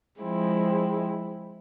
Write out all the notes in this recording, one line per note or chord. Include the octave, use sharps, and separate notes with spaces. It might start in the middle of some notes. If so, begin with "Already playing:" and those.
F3 G#3 C4 E4